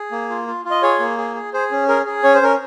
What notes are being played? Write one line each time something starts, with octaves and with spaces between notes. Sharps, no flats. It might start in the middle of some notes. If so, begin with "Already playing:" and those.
Already playing: G#4
A#3
F4
F4
F4
D#5
G#4 C#5
A#3
G#4
G#4
G#4 C5
C#4
G#4 A#4
G#4
C#4 C#5
C5
C#4 A#4